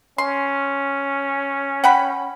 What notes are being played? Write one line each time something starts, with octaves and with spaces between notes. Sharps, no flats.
C#4 C6
F#5 G5 B5